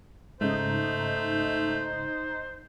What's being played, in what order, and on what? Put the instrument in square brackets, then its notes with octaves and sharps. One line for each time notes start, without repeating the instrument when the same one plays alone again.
[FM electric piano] G#2 C#3 [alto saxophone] A3 [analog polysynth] D#4 [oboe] C5